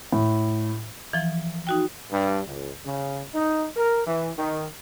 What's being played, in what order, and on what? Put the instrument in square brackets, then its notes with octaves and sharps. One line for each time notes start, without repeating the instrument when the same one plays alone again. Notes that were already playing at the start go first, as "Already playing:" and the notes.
[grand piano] A2
[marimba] E3 F3
D#4 F#4 G5
[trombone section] G2
C#2
C#3
D#4
A#4
E3
D#3